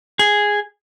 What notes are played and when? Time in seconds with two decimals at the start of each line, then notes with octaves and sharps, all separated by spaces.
0.19 G#4